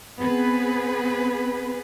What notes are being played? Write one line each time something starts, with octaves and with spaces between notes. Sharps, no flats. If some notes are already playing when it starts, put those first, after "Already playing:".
B3 C4 G#4 B4